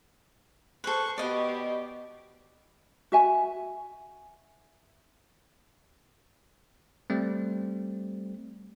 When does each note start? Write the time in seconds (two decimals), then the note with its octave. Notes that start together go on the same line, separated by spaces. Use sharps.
0.84 A4 B4 C5 C#6
1.18 B2 G4 D5 D#5
3.12 F#4 E5 G#5
7.10 G3 A3 C4